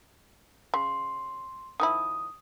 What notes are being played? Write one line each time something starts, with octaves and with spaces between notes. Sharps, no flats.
C#3 C6
D#3 F3 E4 D#6